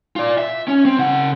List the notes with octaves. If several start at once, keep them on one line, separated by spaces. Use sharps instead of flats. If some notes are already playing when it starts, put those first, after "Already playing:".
F4 D5
E5
C#4
C4
C#3 F#5